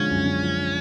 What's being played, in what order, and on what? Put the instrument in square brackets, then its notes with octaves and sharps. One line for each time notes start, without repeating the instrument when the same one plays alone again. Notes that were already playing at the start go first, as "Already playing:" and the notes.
Already playing: [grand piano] D3 F3 G#3 [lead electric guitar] C#4
[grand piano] F#2
D3
F3